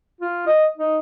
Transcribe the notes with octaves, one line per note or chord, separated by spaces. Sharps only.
F4
D#5
D#4